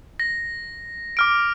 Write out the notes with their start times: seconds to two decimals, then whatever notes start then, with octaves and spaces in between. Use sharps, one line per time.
0.20 A#6
1.17 D6 F6 D7